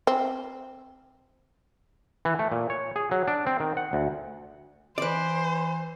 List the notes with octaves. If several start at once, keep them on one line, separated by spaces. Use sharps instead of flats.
C4
E3
A3
A#2
C#5
G#4
F#3
D4
C4
D#3
F#5
D2
E3 B4 C5 D5